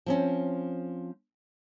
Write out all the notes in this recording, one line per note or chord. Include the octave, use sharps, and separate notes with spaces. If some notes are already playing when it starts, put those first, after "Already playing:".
F3 C4 C#4